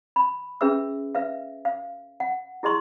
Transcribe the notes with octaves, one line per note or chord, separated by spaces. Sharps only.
B5
C#4 G#4 B4 E5 E6
B4 E5 F5
F5
F#5
E4 G#4 D#5 C6 C#6